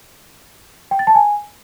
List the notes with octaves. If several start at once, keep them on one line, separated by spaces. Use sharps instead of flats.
G5
A6
A5
G#5